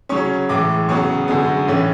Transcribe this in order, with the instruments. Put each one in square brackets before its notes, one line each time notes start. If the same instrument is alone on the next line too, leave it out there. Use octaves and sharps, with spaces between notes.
[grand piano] C#3 F#3 C#4 C#6
A2 E3 G#3 D6
F#2 C#3 F#3 B3 C#6
F#2 D3 G#3 B3
A2 E3 A3 C#4